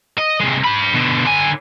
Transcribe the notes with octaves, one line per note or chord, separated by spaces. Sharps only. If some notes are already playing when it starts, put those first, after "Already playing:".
D#5
C3 G#3
D4 B5
B2 D3
D3 G#5